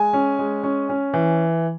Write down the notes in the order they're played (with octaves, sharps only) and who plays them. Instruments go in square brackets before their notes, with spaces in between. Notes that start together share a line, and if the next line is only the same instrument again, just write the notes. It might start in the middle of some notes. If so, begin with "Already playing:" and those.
Already playing: [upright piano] G#3 G#5
C#4
G#3
C#4
C#4
E3